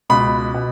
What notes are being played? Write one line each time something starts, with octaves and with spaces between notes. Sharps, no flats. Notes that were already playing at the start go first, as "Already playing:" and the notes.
C#2 B2 B5
B2